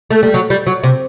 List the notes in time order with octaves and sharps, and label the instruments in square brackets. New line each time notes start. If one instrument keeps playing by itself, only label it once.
[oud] A3
G3
F#3
G3
F#3
C3